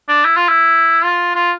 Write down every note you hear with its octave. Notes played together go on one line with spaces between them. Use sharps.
D4
E4
F4
E4
F4
F4